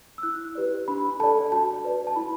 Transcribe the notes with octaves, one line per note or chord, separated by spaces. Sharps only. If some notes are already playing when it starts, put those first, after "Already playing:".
E6
E4 F#6
G4 B4 D5
D4 B5
A4 D5 A5
F#4 A5
B4 D5
A5
E4 B5